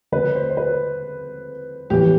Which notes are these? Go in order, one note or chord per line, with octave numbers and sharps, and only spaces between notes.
D3 A3 C4 B4
C5
C5
B4
A2 E3 B3 G4